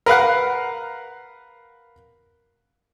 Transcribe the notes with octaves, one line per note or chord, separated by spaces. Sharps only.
A#4 B4 F5 F#5